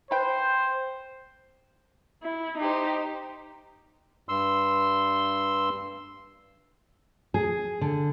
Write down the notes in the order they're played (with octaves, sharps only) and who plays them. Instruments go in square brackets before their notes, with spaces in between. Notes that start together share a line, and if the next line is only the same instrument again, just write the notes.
[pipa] B4 G5 [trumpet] C5
[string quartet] E4
D#4 G4 C5
[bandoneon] G2 C6 E6
[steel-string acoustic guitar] G#4
D3